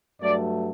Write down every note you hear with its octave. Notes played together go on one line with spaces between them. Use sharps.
G2 F#3 A3 D5